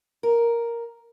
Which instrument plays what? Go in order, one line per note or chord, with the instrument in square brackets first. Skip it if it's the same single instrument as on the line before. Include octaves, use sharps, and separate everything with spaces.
[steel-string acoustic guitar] A#4